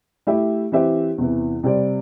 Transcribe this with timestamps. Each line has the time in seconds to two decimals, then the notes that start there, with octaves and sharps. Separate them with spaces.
0.27 A3 E4 G4 E5
0.72 E3 C4 G4 E5
1.18 E2 C3 E3
1.63 C3 G3 C4 G4 D5